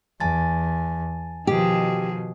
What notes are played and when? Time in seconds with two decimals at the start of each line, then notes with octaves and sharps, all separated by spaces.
0.20 E2 G#5 A5 A6
1.47 B2 D#3 F3 G4 G#4